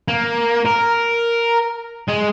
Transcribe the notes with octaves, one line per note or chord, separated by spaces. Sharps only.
A#3
A#4
G#3